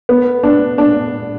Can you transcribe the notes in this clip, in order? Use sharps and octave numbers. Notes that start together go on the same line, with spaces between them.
B3
D4
D4